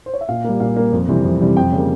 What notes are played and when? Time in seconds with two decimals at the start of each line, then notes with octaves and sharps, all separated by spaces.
0.06 C5
0.14 C#5
0.21 E5
0.29 A#2 F5
0.44 G3 A#3
0.60 A#2 F5
0.76 G3 A#3
0.93 F2
1.08 C3 E3 G3 C4
1.24 F2
1.40 C3 E3 G3 C4
1.57 F2 G5
1.72 C#3 G3 A#3